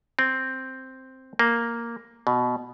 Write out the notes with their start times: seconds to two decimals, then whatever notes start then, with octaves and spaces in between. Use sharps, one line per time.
0.19 C4
1.39 A#3
2.27 B2